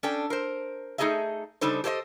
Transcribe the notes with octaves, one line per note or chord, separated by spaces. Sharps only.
C#4 D4 A4 G5
A#4 C5
A3 D#4 G#4 A4 D#5 E5
C#3 G3 D4 D#4 A4 C5
G4 A4 C5 C#5 D#5